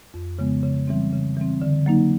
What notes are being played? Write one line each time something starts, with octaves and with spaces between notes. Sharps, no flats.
F2
C#3 F3 G#3 B3
C#3
E3 G3 C4
C#3
E3 G3 C4
D3
F#3 A#3 D#4